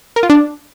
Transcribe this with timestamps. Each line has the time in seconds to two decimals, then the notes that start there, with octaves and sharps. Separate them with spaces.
0.16 A#4
0.23 F4
0.30 D4